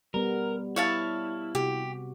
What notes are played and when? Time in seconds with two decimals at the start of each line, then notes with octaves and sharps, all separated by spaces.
0.14 G3 B3 A#4
0.76 E4 C#5 F5 A5
1.55 C3 F#4 G4